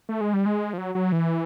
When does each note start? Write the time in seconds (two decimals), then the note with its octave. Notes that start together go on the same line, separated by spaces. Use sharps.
0.09 A3
0.21 G#3
0.34 G3
0.46 G#3
0.73 F3
0.78 F#3
0.95 F#3
1.12 E3